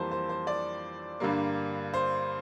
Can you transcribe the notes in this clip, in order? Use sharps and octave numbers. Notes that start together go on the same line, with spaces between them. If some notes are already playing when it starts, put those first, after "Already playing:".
Already playing: F2 E3 G3 A#3 C5 A5
C5
C5
D5
G2 D3 G3 A#3
C5